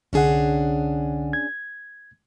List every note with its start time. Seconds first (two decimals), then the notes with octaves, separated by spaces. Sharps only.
0.13 C2 D3 C#4 D4 G#4 F#5
1.33 G#6